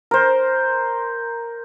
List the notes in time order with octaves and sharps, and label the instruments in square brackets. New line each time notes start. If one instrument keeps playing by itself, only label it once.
[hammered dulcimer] A#4 C5